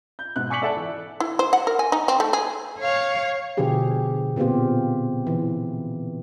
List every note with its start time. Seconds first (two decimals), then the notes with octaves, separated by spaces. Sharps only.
0.19 G6
0.36 G#2 B2 F#6
0.50 G#5 C#6 D6 B6 C#7 F#7
0.62 A4 D5 E5 F#5 A5
0.77 E3
1.20 E4
1.39 C5
1.53 F#5
1.67 A#4
1.79 G#5
1.92 D#4
2.08 C4
2.20 A3
2.33 G#4
2.79 C#5 F5
3.57 B2 D3 F3 G4 G#4
4.36 A#2 B3 C4 F4 G4
5.27 E3